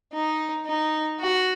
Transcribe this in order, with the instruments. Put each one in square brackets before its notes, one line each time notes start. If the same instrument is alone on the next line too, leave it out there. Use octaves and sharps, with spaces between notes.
[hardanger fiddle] D#4
D#4
F#4